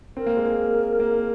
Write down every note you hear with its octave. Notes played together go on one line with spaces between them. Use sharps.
C4 A#4
A#3
G#3
A#3
A#3